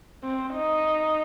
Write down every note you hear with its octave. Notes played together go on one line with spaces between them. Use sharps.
C4
D#4